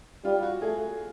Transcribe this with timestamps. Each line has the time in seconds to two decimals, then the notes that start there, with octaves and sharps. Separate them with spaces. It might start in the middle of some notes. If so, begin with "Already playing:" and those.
0.25 G3 F4
0.43 F#4
0.61 A3 G#4